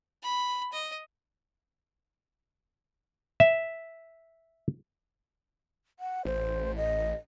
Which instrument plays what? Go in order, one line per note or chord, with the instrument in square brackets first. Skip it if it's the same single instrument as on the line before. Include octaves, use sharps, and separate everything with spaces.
[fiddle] B5
D#5
[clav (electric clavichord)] E5
[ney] F#5
[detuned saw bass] A1 [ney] C5
[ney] D#5